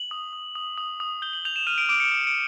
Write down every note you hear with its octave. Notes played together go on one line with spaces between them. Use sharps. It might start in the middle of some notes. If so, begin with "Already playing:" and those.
Already playing: F#7
D#6
D#6
D#6
D#6
D#6
G6 G7
F#7
G6 F7
E7
F6 D#7
D7
D6 D7
C#7
D6 C#7
D7